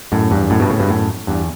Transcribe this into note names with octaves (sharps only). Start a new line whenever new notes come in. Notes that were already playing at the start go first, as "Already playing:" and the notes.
F#2 A2
E2 G2
F#2 A2
G2 B2
A2 C#3
G2 B2
F#2 A2
E2 G2